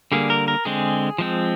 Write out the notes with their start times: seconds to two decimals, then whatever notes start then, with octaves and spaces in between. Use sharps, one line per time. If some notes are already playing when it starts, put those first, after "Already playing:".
0.12 D3 G3 A#3 G#4
0.30 A#4
0.48 A#4
0.65 D3 G#3 C4 G#4
1.18 F3 G#3 C4